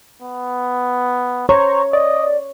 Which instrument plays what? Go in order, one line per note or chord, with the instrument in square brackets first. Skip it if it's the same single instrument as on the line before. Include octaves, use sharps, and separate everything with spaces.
[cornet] B3
[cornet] C5 [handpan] C#5 [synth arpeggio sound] A#5 C#6
[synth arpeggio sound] D5 [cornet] D#5